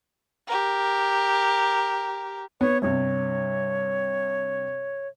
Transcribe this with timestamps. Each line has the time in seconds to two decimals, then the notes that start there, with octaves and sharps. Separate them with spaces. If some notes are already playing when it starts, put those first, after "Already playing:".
0.47 G4 A#4
2.61 B3 C#5
2.82 G2 C3 C#5